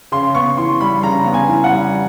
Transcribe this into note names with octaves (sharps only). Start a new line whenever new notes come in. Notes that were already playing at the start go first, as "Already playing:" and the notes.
C#3 C6
B3 C#6
E3 C6
G3 B5
C#3 A#5
B3
G#5
E3
F#5
G3